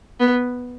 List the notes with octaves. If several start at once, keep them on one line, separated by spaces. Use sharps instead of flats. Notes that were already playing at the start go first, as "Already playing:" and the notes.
B3